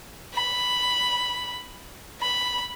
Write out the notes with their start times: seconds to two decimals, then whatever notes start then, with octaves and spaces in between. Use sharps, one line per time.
0.34 B5
2.21 B5